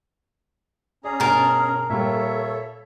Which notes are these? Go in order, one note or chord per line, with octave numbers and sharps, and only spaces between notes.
C#4 G#4 D5 A#5
G2 B2 A#4 A5
A#2 G3 A4 C#5 E5